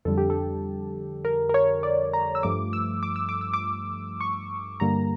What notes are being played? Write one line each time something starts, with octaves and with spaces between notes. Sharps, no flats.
F2 D3 G3 A4
G4
A4
A#4
A#4
C#5
D5
A#5
E6
G2 F3 A3 D6
E6
D6
E6
D6
E6
D6
C#6
G2 D3 G3 A#3 A#5